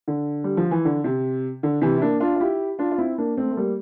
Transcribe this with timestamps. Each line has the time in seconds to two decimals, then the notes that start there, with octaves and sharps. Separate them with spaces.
0.08 D3
0.44 G3
0.57 F3
0.71 E3
0.85 D3
1.04 C3
1.63 D3
1.82 C3 E3
1.97 E4
2.02 A#3 D4
2.20 D4 F4
2.36 F4
2.40 E4 G4
2.79 D4 F4
2.91 F4
2.98 C4 E4
3.18 A#3 D4
3.37 A3 C4
3.51 A3
3.56 G3 A#3